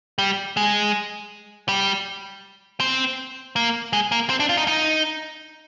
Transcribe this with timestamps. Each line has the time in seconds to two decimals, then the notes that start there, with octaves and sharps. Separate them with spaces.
0.18 G3
0.57 G#3
1.68 G3
2.80 C4
3.56 A#3
3.93 G#3
4.12 A#3
4.30 C4
4.40 D4
4.49 F4
4.57 D#4
4.68 D#4